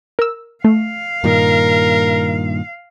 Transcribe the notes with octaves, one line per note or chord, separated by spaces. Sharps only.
A#4 E6
A3 F5
G2 A#2 D#3 A#4